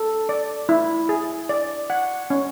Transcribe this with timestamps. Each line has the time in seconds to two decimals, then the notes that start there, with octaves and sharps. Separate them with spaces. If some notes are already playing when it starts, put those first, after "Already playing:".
Already playing: A4
0.29 D5
0.69 E4
1.09 G#4
1.49 D5
1.90 F#5
2.30 C#4